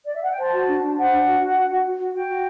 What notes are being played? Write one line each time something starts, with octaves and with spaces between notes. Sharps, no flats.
D5
E5
F#5
G5
C5 A5
F#4
D4
D4
C5 F#5
D4
F#4
F#4
F#4
F#4
F#4
F#4
F#4 G5
F#4